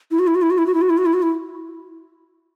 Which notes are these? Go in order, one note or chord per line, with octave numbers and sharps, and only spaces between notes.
E4
F#4
E4
F#4
E4
F#4
E4
F#4
E4
F#4
E4
F#4
E4
F#4
E4